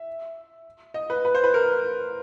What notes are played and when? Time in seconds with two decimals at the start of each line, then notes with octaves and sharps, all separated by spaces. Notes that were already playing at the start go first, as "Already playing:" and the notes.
Already playing: E5
0.94 D#5
1.10 B4
1.25 B4
1.35 C5
1.44 B4
1.54 A#4